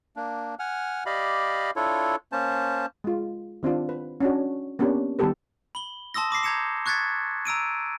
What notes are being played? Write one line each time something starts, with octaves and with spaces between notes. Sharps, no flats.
A#3 D4
F#5 G#5 F6
G4 D5 D#5 F5 B5
D4 E4 F4 A4 C#5
A#3 C#4 C5 A5
G#3 F4
D#3 C4 D4 F4
B4
C#4 D4 F#4
A#3 B3 C#4 D4 G4
D#3 G3 B3 G4 A4 B4
B5 G7
A5 C6 D#6 E6 A#6
B5 D6 A#6 C7
A#5 G6 G#6 A#6 C#7 E7
C#6 F#6 G#6 A6 B6 C#7
A#5 E6 D7 D#7